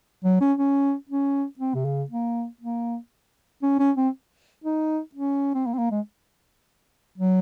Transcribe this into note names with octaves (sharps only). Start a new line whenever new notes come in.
F#3
C#4
C#4
C#4
C4
C3
C#3
A#3
A#3
C#4
C#4
C4
D#4
C#4
C4
A#3
C4
A#3
G#3
F#3